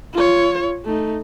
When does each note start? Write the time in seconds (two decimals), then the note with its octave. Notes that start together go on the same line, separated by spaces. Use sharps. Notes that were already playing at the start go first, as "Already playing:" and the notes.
0.13 F4 C#5
0.85 A3 D#4